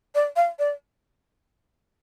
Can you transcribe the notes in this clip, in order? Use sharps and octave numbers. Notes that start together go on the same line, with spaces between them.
D5
F5
D5